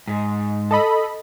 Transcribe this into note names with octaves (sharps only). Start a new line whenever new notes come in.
G#2
A4 D#5 B5